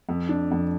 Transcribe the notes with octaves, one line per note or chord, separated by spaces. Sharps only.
F2
D4
F2